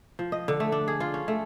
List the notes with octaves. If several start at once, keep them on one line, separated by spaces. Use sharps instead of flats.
F3
D#5
D3
A3
D4
G#4
F4
C#4
A3